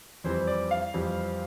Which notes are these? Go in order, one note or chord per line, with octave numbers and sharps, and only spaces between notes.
F2 E3 G3 C4 C5
D5
F5
F2 E3 G3 C4